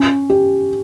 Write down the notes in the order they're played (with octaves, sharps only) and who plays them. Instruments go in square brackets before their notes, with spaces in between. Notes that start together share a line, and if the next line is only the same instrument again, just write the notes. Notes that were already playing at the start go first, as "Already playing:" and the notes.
Already playing: [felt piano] C#4
G4